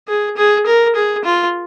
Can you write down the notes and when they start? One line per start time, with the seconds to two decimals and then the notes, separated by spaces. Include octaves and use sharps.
0.08 G#4
0.37 G#4
0.66 A#4
0.96 G#4
1.25 F4